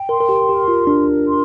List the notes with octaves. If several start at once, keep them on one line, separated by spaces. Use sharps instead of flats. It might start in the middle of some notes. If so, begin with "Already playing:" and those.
Already playing: G5
A#4 C6
A#4
G4
G4 A#4
F4
D4 A#4
C6